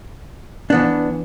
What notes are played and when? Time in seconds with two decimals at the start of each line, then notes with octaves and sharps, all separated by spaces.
0.70 E3 B3 D4